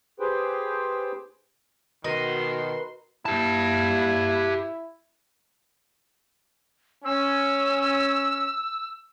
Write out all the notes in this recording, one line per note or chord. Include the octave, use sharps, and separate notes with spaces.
G4 G#4 B4 C5 G5
B2 D#3 F#4 A#4 B4 D#5 C6
A#3 E4 G4 A5
C#4 E6